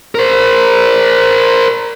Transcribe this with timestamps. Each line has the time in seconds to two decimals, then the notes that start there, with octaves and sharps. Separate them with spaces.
0.15 A#4 C5